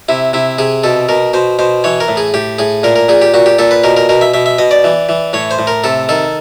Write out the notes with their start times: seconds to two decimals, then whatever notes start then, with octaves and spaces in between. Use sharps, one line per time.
0.09 C3 E4
0.33 C3 E4
0.58 C3 G#4
0.84 B2 A4
1.09 B2 A#4
1.34 B2 C5
1.59 B2 C5
1.84 E3 C#5
2.00 A#4
2.08 A2
2.17 G#4
2.34 A2 G4
2.59 A2 G#4
2.83 A#2 A#4
2.96 A#4
3.09 A#2 G#4
3.21 G4
3.34 A#2 F#4
3.46 G4
3.59 A#2 A4
3.71 B4
3.84 B2 A#4
3.97 A#4
4.09 B2 A#4
4.21 E5
4.34 B2 E5
4.46 E5
4.58 B2 D#5
4.71 D5
4.84 E3
5.09 E3
5.33 A2 C#5
5.51 C5
5.59 A2
5.67 A#4
5.84 C3 A4
6.09 D#3 A4